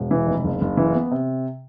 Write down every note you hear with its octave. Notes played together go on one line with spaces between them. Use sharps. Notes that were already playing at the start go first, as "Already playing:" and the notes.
Already playing: E1
E3
F1
F#1
F#1
E3
B3
C3